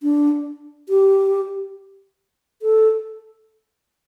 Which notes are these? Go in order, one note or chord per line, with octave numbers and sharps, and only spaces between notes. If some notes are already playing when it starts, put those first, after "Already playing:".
D4
G4
A4